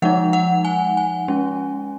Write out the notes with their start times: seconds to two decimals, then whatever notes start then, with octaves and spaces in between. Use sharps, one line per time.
0.02 F3 G#3 D#4 F#5
0.33 F#5
0.65 G#5
0.97 G#5
1.28 G#3 C#4